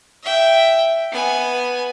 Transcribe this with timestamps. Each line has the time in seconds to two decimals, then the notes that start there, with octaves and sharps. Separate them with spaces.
0.23 E5 G5
1.12 B3 G#5